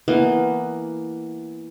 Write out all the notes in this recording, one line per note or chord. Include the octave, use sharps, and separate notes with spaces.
E3 A#3 B3